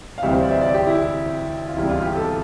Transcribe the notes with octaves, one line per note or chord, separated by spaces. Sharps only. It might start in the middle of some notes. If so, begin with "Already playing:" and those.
F5
D2 C3 E3 G3 E5
C5
D5
E5
D5
G4
E4
F4
E1 D2 C3 G3 E4
F4
G4
A4